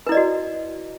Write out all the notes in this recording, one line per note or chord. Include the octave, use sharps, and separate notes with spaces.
E4 F#4 B4 D5 D#5